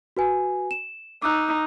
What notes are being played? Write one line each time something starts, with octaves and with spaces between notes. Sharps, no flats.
F#4 B4 G#5
E7
D#4 D6 E6 F#6